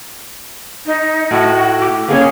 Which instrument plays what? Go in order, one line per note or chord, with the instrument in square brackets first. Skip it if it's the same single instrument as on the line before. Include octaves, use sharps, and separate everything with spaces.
[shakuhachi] D#4
[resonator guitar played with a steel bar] A2 [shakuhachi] F#4
[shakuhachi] D6
[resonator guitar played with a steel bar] A#3 B3 C#4 [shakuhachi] G#4